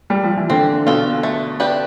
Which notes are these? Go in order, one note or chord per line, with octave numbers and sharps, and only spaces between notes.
G3
F3
E3
D3 C4
B2 F4 A4
A3
D4 G4 B4